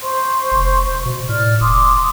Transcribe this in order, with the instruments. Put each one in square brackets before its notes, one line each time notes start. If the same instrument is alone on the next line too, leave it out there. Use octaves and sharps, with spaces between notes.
[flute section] C5 C6 C#6
[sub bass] F1
B2
[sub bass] A2 [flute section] D5 F6
[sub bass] F1 [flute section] C6 D6 D#6